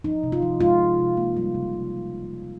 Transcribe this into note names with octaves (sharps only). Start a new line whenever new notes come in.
F3 D#4
C3
F4
F3
G#3 F4
F3
C3
A#3
G3
C#3
C#3